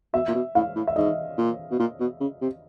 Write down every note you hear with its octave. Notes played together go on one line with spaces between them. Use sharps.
B2 E5
A#2
B2
A2 F5
A2
E5
G#2 D#5
A#2
B2
A#2
B2
C#3
C3